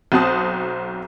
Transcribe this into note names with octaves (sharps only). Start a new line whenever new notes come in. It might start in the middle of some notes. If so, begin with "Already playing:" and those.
B1 C4 F#4 C5 A5 D#6